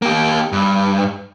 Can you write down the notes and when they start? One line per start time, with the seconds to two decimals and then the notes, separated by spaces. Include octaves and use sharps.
0.02 A#3 G4
0.52 G2